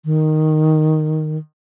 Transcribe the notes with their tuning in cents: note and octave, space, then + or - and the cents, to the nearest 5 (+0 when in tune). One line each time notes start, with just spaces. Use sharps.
D#3 -5